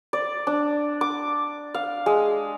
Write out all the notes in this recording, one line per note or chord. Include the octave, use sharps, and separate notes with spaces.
D5
D4
D6
F5
G#3